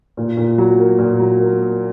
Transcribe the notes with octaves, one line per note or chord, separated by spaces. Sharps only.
A#2
A#2
F#3
A#3
A#2
F#3
A#3
A#3